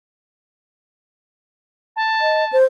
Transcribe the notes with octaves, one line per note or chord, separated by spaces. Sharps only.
A5
D#5
C5